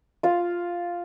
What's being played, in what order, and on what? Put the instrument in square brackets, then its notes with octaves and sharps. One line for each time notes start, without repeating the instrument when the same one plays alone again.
[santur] F4 F5